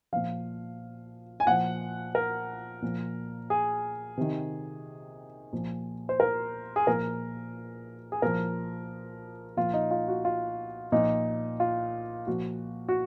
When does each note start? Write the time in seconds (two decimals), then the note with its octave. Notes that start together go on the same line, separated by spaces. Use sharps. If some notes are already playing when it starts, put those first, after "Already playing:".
0.13 A#2 F3 F5
1.40 G#5
1.47 A#2 F3 F#5
2.15 A#4
2.82 A#2 F3
3.50 G#4
4.17 C3 D#3
5.53 A#2 F3
6.09 C5
6.20 A#4
6.76 G#4
6.87 A#2 F3 A#4
8.12 G#4
8.22 A#2 F3 A#4
9.57 A#2 F3 F4
9.74 D#4
9.91 F4
10.08 F#4
10.25 F4
10.92 A#2 F3 D#4
11.60 F4
12.27 A#2 F3 F#4
12.89 F#4